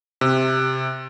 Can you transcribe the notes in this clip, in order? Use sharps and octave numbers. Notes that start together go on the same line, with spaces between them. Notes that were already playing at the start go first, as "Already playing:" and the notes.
C3